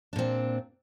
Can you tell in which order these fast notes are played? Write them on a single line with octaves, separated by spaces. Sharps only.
D4 A#2 C4